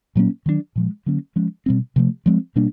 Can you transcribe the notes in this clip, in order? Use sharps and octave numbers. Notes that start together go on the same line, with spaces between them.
A#2 F#3 A#3 C#4
D#3 F#3 B3 D4
A#2 F3 G#3
D3 F#3 A#3 C#4
F3 G#3 C#4
B2 G3 C4
C3 F3 A3
F3 G#3 C4
B2 G3 A#3 D4